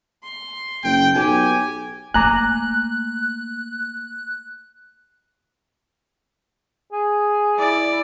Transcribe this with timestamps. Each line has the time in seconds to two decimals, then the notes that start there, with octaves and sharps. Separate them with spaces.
0.23 C6
0.84 F#1 G5
1.15 B1 G4 G#5
2.14 A3 A#3 G#5 A#5 D6 F#6
6.93 G#4
7.57 E4 D5